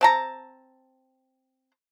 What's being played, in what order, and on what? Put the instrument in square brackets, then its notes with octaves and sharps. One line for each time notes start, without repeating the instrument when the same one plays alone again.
[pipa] C4 A5 A#5